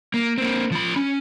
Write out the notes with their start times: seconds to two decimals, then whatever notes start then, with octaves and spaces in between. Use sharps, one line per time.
0.14 A#3
0.38 A#3 C4
0.71 F3 B5
0.96 C#4